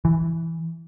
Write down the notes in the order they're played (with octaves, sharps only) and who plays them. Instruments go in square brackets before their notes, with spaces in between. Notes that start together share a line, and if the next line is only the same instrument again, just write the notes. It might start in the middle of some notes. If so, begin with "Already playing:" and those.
[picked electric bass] E3